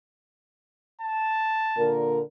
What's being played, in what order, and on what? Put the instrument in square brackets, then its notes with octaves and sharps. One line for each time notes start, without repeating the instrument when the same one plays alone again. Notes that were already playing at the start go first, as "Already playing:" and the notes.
[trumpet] A5
[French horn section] A#2 D3 A#4